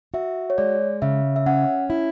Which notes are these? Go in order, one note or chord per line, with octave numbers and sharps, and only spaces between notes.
F#4 E5
C#5
G#3 D5
C#3 E5
E5
C#4 F#5
E4